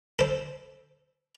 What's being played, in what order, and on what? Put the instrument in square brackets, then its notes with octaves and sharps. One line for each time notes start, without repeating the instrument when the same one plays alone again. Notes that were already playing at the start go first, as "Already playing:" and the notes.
[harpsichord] A4 C5